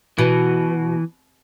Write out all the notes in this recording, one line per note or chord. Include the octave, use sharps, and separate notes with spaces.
B2 E3